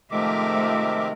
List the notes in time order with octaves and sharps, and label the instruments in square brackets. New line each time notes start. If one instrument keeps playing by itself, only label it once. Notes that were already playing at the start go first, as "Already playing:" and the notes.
[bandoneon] C3 D#3 G#3 [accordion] F3 E5 D6 [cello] A3 A#4